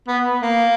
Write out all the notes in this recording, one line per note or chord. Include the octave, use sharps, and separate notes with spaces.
B3
A#3